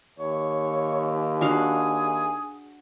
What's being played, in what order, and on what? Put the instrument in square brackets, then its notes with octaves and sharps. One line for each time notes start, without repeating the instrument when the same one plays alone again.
[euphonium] D#2 [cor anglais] C#5
[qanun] D4 F#4 F5 [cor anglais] G#4